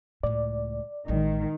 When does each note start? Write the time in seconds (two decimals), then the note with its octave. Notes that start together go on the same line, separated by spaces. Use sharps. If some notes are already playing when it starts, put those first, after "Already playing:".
0.23 C#2 A2 D5
1.08 A1 D#3 G#3